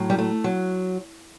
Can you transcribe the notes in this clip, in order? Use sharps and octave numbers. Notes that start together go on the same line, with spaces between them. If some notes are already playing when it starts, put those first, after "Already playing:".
Already playing: A2 F#3
G3
A3
F#3